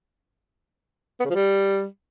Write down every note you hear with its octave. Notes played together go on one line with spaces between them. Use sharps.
B3
C#3
F3
G3